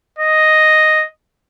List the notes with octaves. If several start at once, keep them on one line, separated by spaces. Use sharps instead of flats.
D#5